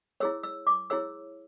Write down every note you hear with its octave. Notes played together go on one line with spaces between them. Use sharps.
E4 G#4 C#5 E6
E6
D6
E4 G#4 C#5 E6